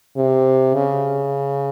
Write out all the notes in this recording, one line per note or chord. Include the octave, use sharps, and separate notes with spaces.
C3
C#3